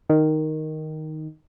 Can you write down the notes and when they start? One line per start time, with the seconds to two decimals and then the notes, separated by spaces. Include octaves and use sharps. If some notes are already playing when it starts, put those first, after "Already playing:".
0.09 D#3